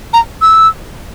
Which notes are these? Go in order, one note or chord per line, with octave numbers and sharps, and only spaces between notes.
A#5
E6